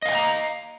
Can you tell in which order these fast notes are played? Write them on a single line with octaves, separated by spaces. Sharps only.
D#5 F5 G#5 G5 A#5